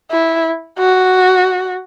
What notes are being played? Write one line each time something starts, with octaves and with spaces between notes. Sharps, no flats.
E4
F#4